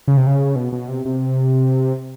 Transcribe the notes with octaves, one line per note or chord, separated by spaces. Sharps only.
C#3
C3
C#3
B2
B2
C3
C3